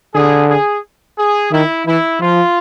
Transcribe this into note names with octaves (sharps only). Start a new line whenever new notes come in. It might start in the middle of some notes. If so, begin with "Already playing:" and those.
D3 G#4
G#4
G#4
D#3 E4
E3 E4
F3 F4